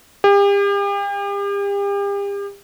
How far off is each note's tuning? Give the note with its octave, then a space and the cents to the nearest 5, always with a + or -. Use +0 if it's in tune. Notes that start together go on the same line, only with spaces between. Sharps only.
G4 +40